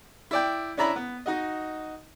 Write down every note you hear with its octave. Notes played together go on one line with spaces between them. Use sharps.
E4 D5 G5
C#4 D4 E4 A#5 B5
B3
D#4 F#4 D#5